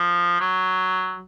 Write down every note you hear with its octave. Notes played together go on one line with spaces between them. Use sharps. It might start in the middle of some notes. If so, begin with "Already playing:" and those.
Already playing: F3
F#3